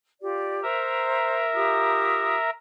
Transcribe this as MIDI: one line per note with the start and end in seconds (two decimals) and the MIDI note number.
0.20 0.62 65
0.20 0.62 67
0.20 0.62 74
0.63 2.50 70
0.63 1.43 72
0.63 2.50 76
0.63 2.50 82
1.54 2.36 65
1.54 2.36 67
1.54 2.36 87